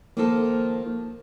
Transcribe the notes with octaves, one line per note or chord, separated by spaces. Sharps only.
D#3 F3 A#3 A4